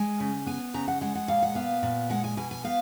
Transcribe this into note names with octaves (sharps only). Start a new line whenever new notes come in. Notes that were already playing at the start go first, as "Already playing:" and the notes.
Already playing: G#3 G#5
C#3
B3 G#5
C#3 A#5
F#5
G#3 F#5
F#5
A#2 F5
F#5
B3 F5
A#2
G#3 F#5
G#5
B2 G#5
G#5
B3 F5